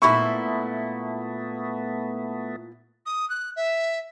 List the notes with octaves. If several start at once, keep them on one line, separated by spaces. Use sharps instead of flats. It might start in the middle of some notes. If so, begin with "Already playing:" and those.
A#2 A3 B3 E4 A4 B5 C#6
D#6
F#6
E5